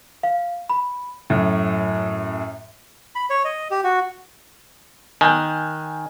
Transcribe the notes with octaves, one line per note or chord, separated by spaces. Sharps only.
F5
B5
F#2 A2
B5
C#5
D#5
G4
F#4
D#3 G#5 F#6 G6